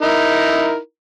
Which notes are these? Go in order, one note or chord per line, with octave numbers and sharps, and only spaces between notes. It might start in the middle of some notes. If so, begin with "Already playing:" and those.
D#4 E4 A#4